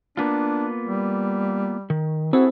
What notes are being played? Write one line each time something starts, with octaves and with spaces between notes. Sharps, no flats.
A#3 B3 D4 F4
G3
D#3
C4 E4 F#4 G#4 A4